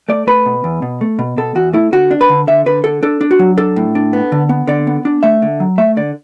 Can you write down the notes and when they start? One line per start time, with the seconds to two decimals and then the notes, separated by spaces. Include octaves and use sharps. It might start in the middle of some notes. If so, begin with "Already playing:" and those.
0.09 A3 D5
0.27 A3 B4
0.46 B2
0.64 E2
0.82 B2
1.01 A3
1.19 B2
1.37 B2 A4
1.55 E2 F#4
1.73 A3 E4
1.92 D3 F#4
2.11 D4
2.21 B4
2.29 D3
2.47 D3 E5
2.66 D3 B4
2.84 D3 A4
3.03 D4 A4
3.21 D4
3.31 F#4
3.39 F#3
3.57 D4 A4
3.76 A2
3.95 D4
4.13 B3
4.32 D3
4.49 B3
4.67 D3 D5
4.87 B3
5.05 D4
5.23 A3 E5
5.42 D3
5.60 F#3
5.78 A3 E5
5.97 D3 D5